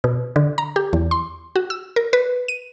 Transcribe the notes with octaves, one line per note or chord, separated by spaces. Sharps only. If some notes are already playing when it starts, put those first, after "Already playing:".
B2
D3
A#5
G4
E2
C6
F#4
E6
A#4
B4
D#7